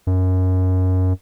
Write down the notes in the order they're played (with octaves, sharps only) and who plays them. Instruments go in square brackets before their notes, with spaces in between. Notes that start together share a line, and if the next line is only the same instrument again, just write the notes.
[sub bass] F#2